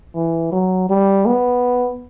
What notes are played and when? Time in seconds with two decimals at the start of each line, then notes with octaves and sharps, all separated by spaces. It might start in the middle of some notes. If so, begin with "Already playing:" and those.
0.15 E3
0.52 F#3
0.90 G3
1.26 B3